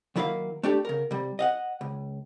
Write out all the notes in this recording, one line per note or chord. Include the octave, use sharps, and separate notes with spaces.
D#3 F#3 A#3 E4 D5 F5
A3 D4 G4
C#3 A#4
C3 G3
D#5 F5 F#5
C#2